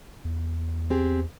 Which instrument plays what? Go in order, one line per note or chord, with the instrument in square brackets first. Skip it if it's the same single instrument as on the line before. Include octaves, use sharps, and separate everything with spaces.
[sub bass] E2
[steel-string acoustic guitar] C4 G4 G#4